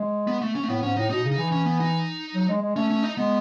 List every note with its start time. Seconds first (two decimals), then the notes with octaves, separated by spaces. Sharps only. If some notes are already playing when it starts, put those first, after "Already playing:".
Already playing: G#3
0.27 B3
0.42 A3
0.55 C#4
0.64 A3
0.69 A2 B3
0.83 G#2 C#4
0.97 A2 D#4
1.10 B2 D#4
1.24 C#3
1.31 D#4
1.38 E3
1.52 C#4
1.66 B3
1.80 D#4
2.35 F#3
2.48 G#3
2.62 G#3
2.76 A3 C#4
2.90 C#4
3.03 D#4
3.17 G#3 B3